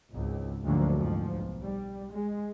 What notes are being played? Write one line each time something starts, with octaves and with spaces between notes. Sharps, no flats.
G#1 C#2
D2 G#2 D3 F3 F#3 A#3
F2 G#2 F3
B1
G3
G#3